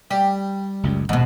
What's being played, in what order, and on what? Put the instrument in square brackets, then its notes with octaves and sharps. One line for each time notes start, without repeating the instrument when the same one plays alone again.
[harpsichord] G3 [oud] G4
[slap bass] F#1 C#2 F#2
[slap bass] D#1 [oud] G#2 B2